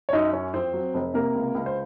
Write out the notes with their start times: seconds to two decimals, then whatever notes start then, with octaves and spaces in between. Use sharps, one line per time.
0.09 C#5
0.13 F#2 D#4 D#5
0.33 F#2 C#4 C#5
0.54 F2 C4 C5
0.73 F#3
0.94 F1
1.14 C3 A#3 A#4
1.35 C#2
1.55 C#2
1.66 C5